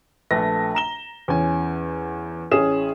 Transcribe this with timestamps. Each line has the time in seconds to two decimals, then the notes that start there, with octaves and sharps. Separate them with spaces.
0.31 A#1 A3 A4 B4 A#6
0.75 A#5 E7 G7
1.28 E2 C#4 G#5
2.52 A1 C#4 G#4 E7